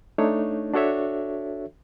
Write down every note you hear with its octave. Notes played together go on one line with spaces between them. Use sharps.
A3 D4 D#4 C#5
D4 F#4 A4 C#5 E5